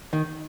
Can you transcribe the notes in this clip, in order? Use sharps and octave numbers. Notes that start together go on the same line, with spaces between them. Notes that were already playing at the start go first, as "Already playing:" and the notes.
D#3